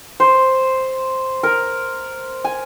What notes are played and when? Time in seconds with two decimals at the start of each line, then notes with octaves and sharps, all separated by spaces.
0.20 C5
1.43 A#4
2.45 G#5